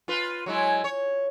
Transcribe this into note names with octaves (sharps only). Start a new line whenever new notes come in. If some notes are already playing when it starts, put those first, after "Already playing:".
F4 B4
F#3 G#3 E4
C#5